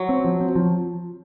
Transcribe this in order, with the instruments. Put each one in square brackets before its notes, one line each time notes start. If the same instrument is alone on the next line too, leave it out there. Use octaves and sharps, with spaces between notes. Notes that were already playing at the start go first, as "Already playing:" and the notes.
Already playing: [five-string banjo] F#3
[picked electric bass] C4
F3
C4
F3